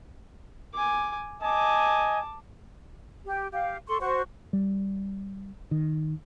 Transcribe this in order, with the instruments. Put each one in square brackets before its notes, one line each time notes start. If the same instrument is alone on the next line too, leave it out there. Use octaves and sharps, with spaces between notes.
[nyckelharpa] G#5 D6
[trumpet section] D#5 G#5 [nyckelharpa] A5 D6
[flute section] G4
G4 F5
A4 C6 C#6
F#4 C5 C#6
[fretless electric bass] G3
D#3